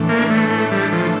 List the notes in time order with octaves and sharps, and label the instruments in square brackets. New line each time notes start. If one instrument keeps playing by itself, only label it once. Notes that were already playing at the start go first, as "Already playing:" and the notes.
Already playing: [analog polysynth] A2 E3 A3 D4 A4
[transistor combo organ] A#3
[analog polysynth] A2 [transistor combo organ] A3
[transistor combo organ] A3
[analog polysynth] E3 A3 D4 A4 [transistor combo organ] G3
[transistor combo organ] F3